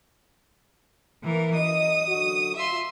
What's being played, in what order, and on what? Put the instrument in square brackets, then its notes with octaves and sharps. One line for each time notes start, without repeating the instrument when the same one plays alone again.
[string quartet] E3 A#3 A#4
[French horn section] F#2 D#5 [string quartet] D#6
[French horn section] D3 F#3 F#4
[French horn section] F4 [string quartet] E5 C6